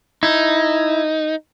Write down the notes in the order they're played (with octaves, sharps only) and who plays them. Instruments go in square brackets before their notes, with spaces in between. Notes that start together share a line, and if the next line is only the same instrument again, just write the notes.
[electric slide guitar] D#4 [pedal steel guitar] E4